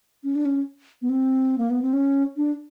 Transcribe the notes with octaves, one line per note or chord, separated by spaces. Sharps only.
C#4
D4
C#4
B3
C4
A#3
B3
C4
C#4
D4